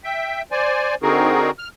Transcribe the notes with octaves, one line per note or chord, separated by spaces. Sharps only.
E5 G5
C5 D5 G#5
D3 C4 D#4 F#4 G#4 A#4
F6